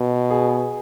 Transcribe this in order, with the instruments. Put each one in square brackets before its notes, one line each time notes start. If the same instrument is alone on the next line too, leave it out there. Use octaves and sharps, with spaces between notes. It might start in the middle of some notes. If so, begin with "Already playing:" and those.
Already playing: [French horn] B2
[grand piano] G#4